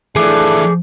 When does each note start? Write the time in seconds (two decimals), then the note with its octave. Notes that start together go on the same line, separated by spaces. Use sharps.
0.16 E3 F3 A3 D4 G#4 A4 D6